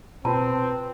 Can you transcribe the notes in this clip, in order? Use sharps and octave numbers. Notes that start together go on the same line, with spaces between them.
B2 C4 F4 B4 A5